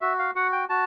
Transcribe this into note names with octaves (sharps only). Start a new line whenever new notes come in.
F#4 E5
F5
F#4 F#5
G5
F#4 A5